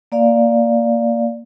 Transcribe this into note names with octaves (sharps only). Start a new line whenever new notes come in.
A#3 D5 F5